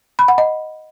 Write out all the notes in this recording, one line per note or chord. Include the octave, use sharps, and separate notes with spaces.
B5
F#5
D#5